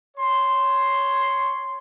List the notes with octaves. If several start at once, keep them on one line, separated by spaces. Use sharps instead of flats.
C#5 C6